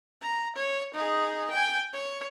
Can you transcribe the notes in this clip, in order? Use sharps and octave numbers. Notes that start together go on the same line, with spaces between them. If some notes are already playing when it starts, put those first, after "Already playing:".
A#5
C#5
D#4 G#4
G5 G#5
C#5